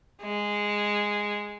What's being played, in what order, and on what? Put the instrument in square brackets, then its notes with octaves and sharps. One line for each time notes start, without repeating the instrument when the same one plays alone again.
[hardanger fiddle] G#3